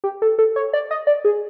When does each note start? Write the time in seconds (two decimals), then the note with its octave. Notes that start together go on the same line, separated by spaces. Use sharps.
0.04 G4
0.22 A4
0.39 A4
0.56 C#5
0.73 D5
0.91 D#5
1.07 D5
1.25 G#4